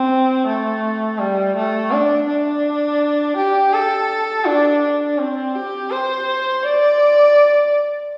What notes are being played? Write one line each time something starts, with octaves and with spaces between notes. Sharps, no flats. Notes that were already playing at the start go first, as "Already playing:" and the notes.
Already playing: C4
A3
G3
A3
D4
D4
G4
A4
D4
D4
C4
G4
C5
D5